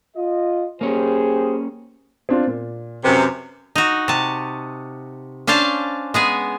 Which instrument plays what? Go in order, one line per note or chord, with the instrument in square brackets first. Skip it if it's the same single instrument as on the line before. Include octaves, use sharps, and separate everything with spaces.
[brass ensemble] F4 D#5
[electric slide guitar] A#3 C#4 [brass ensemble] G4 G#4 C5
[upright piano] C4 D4 F4
A#2
[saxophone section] F#2 C3 [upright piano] B4
[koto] D#4 F#4
C3 A5
C#4 D4 C5 F5 A5
G#3 B3 G#4